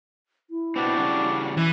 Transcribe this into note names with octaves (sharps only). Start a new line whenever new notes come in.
E4
B2 B3 C4 D4
C#3 G3 F#4
E3